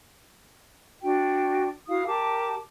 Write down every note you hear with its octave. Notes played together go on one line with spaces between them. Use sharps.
D4 F#4 G5
E4 F#4 F5 D#6
G4 A#4 A5 D6